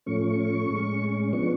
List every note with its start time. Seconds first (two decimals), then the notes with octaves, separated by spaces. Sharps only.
0.06 A2 F3 A3 C#4 C#6
0.70 A2 G#3 C#4
1.33 F3 B3 D4 C#6